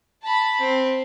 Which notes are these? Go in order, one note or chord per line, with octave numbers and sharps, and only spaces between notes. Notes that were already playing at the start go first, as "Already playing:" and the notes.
A5 B5
C4